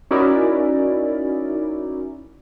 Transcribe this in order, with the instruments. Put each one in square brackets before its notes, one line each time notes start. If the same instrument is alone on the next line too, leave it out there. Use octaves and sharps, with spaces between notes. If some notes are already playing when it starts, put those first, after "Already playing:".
[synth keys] C#4 D#4 E4 F#4 A#4 D5